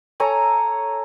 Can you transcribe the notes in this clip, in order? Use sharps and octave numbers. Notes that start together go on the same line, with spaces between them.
A4 C#5 G#5 A#5